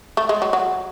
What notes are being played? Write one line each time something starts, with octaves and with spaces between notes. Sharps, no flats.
A3
G#3
F#3
F#3